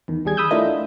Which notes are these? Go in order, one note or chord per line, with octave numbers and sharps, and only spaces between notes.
E2 D#3
D#2 G3 G#4 G#6
B5 D#6 E6 G6
A3 D4 E4 F4 A#4 D#5